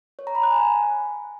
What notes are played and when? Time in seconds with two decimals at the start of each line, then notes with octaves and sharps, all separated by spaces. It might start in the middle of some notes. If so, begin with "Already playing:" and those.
0.19 C#5
0.27 A#5
0.35 B5
0.43 F#6
0.52 G#5